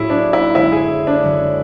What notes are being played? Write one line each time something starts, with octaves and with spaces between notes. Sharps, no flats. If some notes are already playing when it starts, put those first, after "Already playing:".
Already playing: A2 F#3 C#4 E4 F#4 G#4
D4
E4
F#2 D3 G#3 C#4 E4
G#4
D4
F#2 D3 G#3 C#4